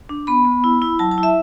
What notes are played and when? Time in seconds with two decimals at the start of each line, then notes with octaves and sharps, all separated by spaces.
0.09 D4
0.27 B3 B5
0.45 B3
0.64 E4
0.82 E4
0.99 F#3 A5
1.11 A5
1.18 E4
1.23 E5